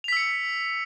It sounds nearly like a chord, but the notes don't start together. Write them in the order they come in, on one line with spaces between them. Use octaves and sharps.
F7 B6 E6 C#7